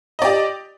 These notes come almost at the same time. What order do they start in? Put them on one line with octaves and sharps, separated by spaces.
D#5 D5 G4